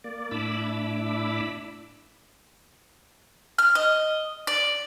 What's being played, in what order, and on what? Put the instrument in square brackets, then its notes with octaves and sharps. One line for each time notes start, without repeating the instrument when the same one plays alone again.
[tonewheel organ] A#3 D5
A2 D4 E4 B5 D6 E6
[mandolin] F6
D#5
D5